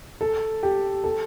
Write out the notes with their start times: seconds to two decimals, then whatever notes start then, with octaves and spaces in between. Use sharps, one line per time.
0.21 A4
0.63 G4
1.04 A4